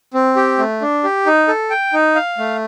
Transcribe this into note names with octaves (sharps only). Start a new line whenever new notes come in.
C4
G4
A3
D4
G4
D#4
A4
G5
D#4
F5
A3